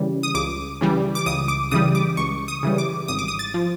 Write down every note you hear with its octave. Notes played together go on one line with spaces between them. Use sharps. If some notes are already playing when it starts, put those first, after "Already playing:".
Already playing: C#3 E3 G3
D#6
C#2 D6
C#3 E3 G3
D6
C#2 D#6
D6
C#3 E3 G3 D#6
D6
C#2 C#6
D#6
C#3 E3 G3
D6
G#1 D#6
D6
D#6
A6
F3